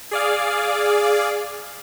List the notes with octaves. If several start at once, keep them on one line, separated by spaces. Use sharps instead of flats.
G#4 D5 F5